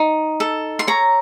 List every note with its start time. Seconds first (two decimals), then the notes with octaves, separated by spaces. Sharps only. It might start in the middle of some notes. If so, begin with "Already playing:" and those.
Already playing: D#4
0.40 A4
0.79 C6
0.87 C#5 A#5